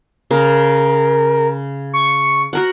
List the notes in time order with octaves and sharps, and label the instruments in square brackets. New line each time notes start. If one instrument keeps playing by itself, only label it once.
[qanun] C#3 [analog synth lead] A#4
[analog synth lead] C#6
[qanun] F#4 A#4 F#5